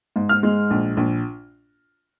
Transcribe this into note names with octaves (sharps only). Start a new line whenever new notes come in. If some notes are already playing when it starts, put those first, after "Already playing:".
G#2
F6
G#3
A#1
A#1